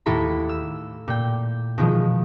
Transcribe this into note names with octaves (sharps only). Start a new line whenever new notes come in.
D#2 A2 E4 A4 A#5 B5
E6
A#2 G5
B2 D#3 F3 G#3